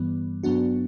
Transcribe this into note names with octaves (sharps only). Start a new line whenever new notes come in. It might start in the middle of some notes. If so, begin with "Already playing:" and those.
Already playing: G2 E3 G3 B3
G2 F#3 B3 D4 F#4